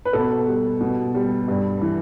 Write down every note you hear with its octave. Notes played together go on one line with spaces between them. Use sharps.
B4
B2 A4
G3
B2
G3
G2
E3